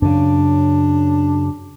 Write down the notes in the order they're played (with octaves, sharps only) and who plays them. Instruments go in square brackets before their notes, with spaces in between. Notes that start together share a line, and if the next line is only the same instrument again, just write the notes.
[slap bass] F#2 C#3 [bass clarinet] D4